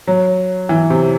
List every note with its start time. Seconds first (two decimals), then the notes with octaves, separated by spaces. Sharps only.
0.07 F#3
0.69 E3
0.90 C3